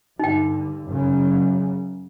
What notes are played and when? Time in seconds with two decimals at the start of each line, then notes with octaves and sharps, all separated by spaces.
0.19 G2 D3 D#4 G5
0.87 F#2 C#3